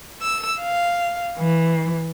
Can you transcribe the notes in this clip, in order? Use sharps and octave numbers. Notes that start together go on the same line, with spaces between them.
E6
F5
E3